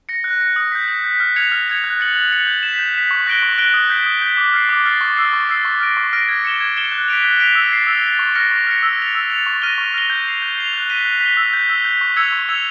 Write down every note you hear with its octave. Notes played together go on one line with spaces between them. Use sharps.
A#6 C#7
F#6
A#6 C#7
D#6
G6 B6
D#6
G6 B6
F6
G#6 C#7 F7
F6
G#6 C#7 F7
F#6
A6 C#7 F#7
F#6
A6 C#7 F#7
G6
B6 E7
G6
B6 E7
C#6
F#6 A#6 D7 G7
C#6
F#6 A#6 D7 G7
D#6
G6 B6
D#6
G6 B6
D6
F6 A6 C7
D6
F6 A6 C7
C#6
E6 A6 C7
C#6
E6 A6 C7
C#6
F6 A#6 D7
C#6
F6 A#6 D7
G#6
C#7 E7 G7
G#6
C#7 E7 G7
F#6
B6 D7 F7
F#6
B6 D7 F7
E6
A6 C7
E6
A6 C7
C#6
F6 A#6 C#7
C#6
F6 A#6 C#7
E6
A6 C#7 F7
E6
A6 C#7 F7
C#6
F6 A#6 D#7 G7
C#6
F6 A#6 D#7 G7
G6
C7 F7
G6
C7 F7
F#6
B6 D#7 G7
F#6
B6 D#7 G7
E6
G6 B6
E6
G6 B6
C#6
E6 G#6 C#7 F7
C#6
E6 G#6 C#7 F7